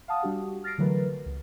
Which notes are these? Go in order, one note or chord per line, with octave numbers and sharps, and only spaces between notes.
F5 F#5 A5 D#6
G3 D4 F#4 G4
F6 A6 A#6 C7 D7
D3 E3 F#3 A3 A#4 B4
C#2